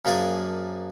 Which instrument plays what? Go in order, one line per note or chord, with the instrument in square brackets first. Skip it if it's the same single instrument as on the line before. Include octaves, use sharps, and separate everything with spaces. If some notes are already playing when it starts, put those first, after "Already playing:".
[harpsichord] F#2 F3 A#3 D4 G#4 G#5